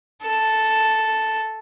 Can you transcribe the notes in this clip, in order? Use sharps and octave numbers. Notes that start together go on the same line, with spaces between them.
A4